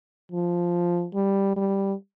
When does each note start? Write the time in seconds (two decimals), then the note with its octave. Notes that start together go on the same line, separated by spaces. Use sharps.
0.32 F3
1.15 G3
1.56 G3